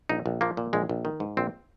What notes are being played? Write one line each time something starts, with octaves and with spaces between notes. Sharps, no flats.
A#1 D#4
A#1
F3 A#3
A#2
A#1 G#3
A#1
D#3
G#2
A#1 C4